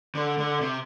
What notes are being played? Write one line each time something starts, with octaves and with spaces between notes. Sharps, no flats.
D3
D3
C3